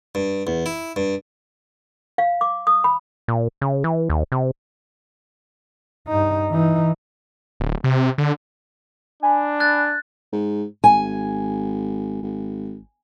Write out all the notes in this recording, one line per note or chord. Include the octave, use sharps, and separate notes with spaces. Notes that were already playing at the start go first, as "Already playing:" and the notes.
G2
E2
E4
G2
F5
D6
D#6
B5
A#2
C#3
E3
D#2
C3
G2 D#4
E3 D#4
D1
C3
D3
D4 G#5 B5
F#6 A6
G#2
G#1 G#5
G#1